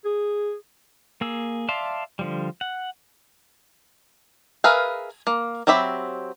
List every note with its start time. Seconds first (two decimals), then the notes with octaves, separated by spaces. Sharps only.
0.05 G#4
1.21 A#3 G#4 E6
1.69 D5 E5 F5 A5 C6
2.19 D3 F3 G3
2.61 F#5
4.64 G#4 A#4 B4 E5 F5
5.27 A#3
5.67 F#3 C4 G4 E5 B5